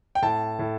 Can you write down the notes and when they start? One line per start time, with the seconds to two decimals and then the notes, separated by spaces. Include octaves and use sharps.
0.15 G5
0.22 A2 A5
0.59 A2